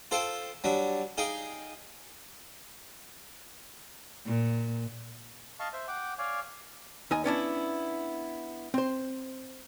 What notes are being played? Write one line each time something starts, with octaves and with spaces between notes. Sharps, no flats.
F4 A4 C5 F5 G5
F#3 G3 D4
D#4 G#4 F5 G5
A#2
D#5 F5 A5 C#6
C5 E5
F#5 G5 D6
C#5 D5 F5 G#5
D#2 D#4 D#5 G#5
B3 C#4 D4 E4
C4 C5